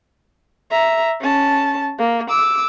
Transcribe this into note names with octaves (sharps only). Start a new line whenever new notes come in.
E5 A#5
C#4 A5
A#3
D6 E6